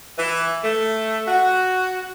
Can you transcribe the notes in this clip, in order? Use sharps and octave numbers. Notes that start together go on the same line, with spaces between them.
E3
A3
F#4